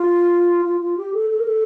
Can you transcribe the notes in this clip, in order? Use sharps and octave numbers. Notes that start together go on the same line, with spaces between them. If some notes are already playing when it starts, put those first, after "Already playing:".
Already playing: F4
F4
F4
G4
A4
A4
A#4
A4